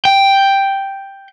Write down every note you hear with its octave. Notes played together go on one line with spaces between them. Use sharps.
G5